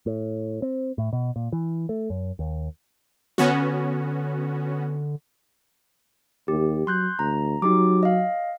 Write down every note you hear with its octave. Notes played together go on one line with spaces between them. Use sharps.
A2
C4
A2
B2
A#2
E3
A3
F#2
D#2
D3 B3 C#4 F#4
D#2 G4
F#3 C6 F#6 G6
D2 A#5
F#3 D#4 G4 D6
D#5 F5